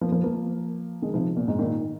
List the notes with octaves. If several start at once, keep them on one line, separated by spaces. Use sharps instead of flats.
F3 A#3
F3 A#3
F3 A#3
D#3 G#3
C3 F3
A#2
G#2
A#2 D#3